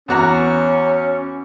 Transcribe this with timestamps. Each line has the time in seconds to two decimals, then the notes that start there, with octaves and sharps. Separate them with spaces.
0.08 E2 C#4 F#4 A#5